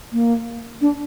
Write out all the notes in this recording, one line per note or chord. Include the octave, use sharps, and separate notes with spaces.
A#3
D4